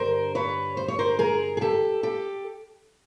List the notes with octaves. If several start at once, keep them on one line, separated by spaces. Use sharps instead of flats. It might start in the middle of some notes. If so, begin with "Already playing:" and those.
Already playing: G2 D3 G3 A#4 C5
B4 C#5
C5
C#5
A#4 C5
G#4 A#4
G#4
G4 A4
G4 A4